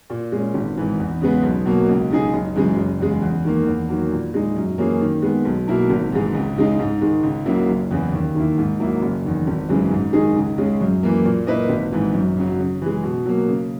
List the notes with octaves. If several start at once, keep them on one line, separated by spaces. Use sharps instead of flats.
A#2
G#3 C#4
G#1
G#2 E3
E2
C#3 G#3 B3
B1
B2 F#3 A#3
C#2
C#3 G#3 D#4 G#4
F#1
F#2 C#3 E3 G#3
F#1
E2 C#3 G#3
E2
D#3 A#3
E2
D#3 F#3 A#3
A#2
G#3 D#4
F#2
E3 A#3 C#4 G#4
D#3
G#3 B3
B1
B2 A#3 E4 A#4
G#1
G#2 E3 G#3
C#2
C#3 G#3 D#4
G#2
D#3 G#3
C#2
C#3 F#3 A#3 E4
F#1
E2 C#3 E3
D#2
D#3 A#3 E4
G#2
F#3 A#3 E4
F#1
E2 D#3
G#1
F#2 C#3 E3 G#3
G#2
D#3 G#3 D#4 G#4
C#2
C#3 G#3 C#4
F#2
E3 A#3
A#2
A#3 E4 B4 D#5
G#1
G#2 E3
F#2
C#3 F#3
C#3
E3 G#3
B2
F#3 A#3
C#3